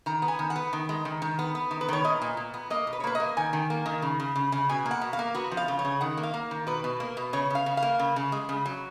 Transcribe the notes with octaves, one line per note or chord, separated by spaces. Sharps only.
D#3 A#5
B3
G#5
D#3
F#5
B3
D#3
G#3
D#3
D#3
B3
B3
D#3
B4
D#3 C#5
A#2 D#5
A#2
A#2
B3
A#3 D#5
B2
B4
C#5
A#3 B4
A#3 D#5
D#3 G#5
D#3
A#3
D#3
C#3
C#3
C#3
C#3
B2 G#5
A#3
F#5
B2
F5
A#3
B3 F#4
F3
F5
C#3
C#5
C#3
D#3 F#5
A#3
F5
A#3
D#3
B2 B4
B2
A#3
B2
C#3 C#5
C#3 F5
C#3
F5
A#3
C#3
C#3
G#3
C#3
F#3